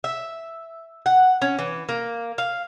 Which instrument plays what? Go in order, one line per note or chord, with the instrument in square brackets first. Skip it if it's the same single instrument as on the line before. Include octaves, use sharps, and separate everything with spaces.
[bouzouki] E5
F#5
C#4
E3
A#3
F5